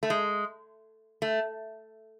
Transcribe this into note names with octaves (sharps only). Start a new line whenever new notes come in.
A3
G#3
A3